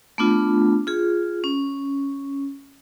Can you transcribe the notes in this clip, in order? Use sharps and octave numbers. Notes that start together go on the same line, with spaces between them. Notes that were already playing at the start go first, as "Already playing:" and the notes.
A3 B3 D4 F4
F4 G#4
C#4